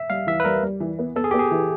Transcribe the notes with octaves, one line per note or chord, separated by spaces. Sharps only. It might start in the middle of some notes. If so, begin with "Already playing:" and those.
Already playing: E5
G3 F5
E3 E5
B4
G3 A#4
G3
E3
B3
B3 A4
G#4
B3 G4
G#4
E3